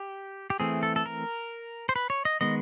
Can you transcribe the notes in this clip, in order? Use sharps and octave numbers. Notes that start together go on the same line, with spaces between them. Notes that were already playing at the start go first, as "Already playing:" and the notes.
Already playing: G4
G4
E3 A3 C4 G#4
A4
A4
A#4
C5
B4
C#5
D#5
D#3 G#3 B3 D#5